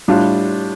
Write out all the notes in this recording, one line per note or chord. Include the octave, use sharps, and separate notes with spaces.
A2 G3 D4 F4